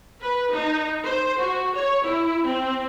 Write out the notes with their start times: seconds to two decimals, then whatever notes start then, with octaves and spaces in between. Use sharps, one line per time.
0.20 B4
0.50 D#4
1.04 C5
1.39 F#4
1.73 C#5
2.03 E4
2.44 C4